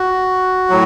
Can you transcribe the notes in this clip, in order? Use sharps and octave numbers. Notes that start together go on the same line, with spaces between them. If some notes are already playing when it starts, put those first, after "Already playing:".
Already playing: F#4
A2 F#3